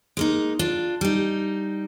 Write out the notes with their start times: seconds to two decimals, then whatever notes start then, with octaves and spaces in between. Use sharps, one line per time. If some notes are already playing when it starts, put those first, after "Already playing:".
0.17 G#3 A#3 D#4
0.59 D4 F4
1.01 G3 D#4